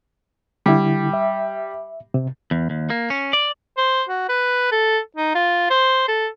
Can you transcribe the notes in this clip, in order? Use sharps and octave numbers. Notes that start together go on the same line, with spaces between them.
D3 G3 E4
E5
C3
E2
D#2
A#3
C#4
D5
C5
F#4
B4
A4
D#4
F4
C5
A4